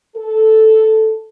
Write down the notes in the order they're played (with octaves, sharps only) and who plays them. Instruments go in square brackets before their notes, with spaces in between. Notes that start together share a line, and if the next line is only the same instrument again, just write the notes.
[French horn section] A4